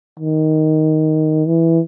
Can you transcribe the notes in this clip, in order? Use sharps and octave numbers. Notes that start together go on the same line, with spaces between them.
D#3
E3